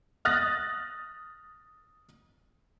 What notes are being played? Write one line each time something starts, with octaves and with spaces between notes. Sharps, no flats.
D#6 F6 F#6 A6 A#6